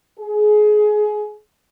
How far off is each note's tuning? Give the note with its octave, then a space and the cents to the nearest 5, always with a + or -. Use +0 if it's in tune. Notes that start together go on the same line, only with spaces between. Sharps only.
G#4 +25